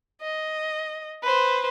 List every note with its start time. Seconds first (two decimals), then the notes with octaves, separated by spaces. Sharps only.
0.22 D#5
1.22 B4 C5